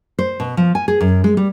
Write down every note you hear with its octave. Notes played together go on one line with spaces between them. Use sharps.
C5
B2
F3
G#5
G#4
F#2
G#3
G3